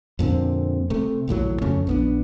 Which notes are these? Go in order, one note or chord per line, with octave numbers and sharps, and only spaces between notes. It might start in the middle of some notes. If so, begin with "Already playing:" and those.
F2 A#2 D3 C4
C3 A3
A#1 D#2 A2 F#3
F2 C#3 A3 C#4
A#1 B3 D4